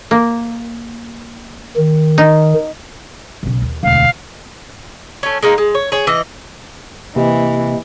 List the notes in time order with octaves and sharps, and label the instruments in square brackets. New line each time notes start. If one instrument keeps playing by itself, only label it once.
[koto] A#3
[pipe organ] D#3
[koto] D#4
[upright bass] B1 C#3
D#2
[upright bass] E1 D2 [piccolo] F5
[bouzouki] A3 C#4
G#3 A#3 D#4
G#3
C#5
G#4 C#5
E3 D#5
[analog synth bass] C3 [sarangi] E3 [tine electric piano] A#3 G4 D#5